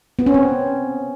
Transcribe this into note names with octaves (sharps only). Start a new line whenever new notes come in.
B3
C#4
C4